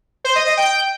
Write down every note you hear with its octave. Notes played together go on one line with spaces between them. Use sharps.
C5
D#5
D#5
G5